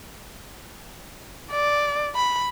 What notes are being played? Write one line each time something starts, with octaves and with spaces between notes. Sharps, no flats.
D5
B5